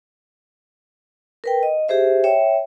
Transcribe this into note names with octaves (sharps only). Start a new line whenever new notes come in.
A#4 B4 G5
D#5
G4 G#4 C5 E5
C#5 E5 G5